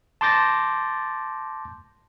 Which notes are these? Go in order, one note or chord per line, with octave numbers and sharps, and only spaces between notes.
A5 C6 D6 G6 A6 A#6